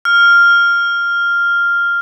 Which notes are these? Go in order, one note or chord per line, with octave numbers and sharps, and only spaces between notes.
F6